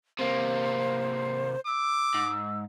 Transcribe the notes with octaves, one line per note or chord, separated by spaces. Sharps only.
C3 A#3 C5
D6 E6
G#2